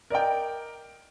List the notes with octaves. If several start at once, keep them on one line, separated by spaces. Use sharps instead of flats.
A#4 D5 D#5 G5